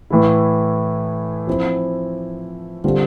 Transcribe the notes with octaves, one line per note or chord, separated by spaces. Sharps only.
A2 E3 A3 E4
F3 C4 E4
D3 G3 C4 F4